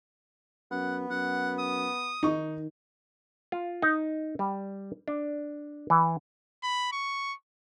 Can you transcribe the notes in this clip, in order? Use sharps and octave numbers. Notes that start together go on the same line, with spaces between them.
F#2 B3 F#5
F#2 F#5
D#6
D#3 D#4 C#6
F4
D#4
G3
D4
E3
B5
C#6